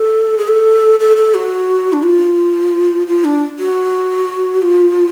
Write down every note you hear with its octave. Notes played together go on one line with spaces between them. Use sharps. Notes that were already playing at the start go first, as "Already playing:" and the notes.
Already playing: A4
G#4
A4
A4
A4
F#4
D4
F4
F4
D4
F#4
F4